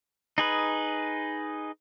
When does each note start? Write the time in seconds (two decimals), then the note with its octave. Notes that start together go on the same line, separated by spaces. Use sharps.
0.38 D#4 G#4 B4